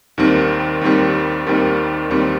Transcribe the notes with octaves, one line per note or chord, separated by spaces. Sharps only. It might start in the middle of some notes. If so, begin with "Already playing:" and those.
D#2 D#3 G3 C4
D#2 D#3 G3 C4
D#2 D#3 G3 C4
D#2 D#3 G3 C4